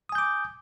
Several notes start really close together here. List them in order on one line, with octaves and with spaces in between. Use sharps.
D#6 G#5 G6 D6